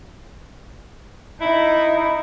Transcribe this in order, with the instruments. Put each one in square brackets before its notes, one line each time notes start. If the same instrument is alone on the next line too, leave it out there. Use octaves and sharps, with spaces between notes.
[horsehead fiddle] D#4 [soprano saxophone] E4